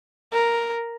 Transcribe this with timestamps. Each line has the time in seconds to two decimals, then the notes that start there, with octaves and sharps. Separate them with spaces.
0.33 A#4